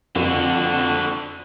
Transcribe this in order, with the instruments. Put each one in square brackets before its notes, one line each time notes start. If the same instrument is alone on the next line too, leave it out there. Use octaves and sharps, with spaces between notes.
[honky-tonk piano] F2 [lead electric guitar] D3 F#4